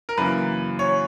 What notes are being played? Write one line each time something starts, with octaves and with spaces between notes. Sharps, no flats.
A#4
F#2 C#3 E3 A#3 B4
C#5